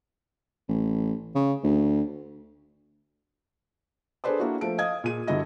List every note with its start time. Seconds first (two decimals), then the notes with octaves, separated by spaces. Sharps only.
0.69 A1
1.35 C#3
1.64 D2
4.24 D4 G#4 A4 B4 C5 D5
4.40 A#3 D4 E4 F#4
4.61 F3 A3 D7
4.78 D#5 F5 D#6 G#6
5.04 A#2 G#4 D#7
5.27 G2 D3 E4 F#4 D#5 A#6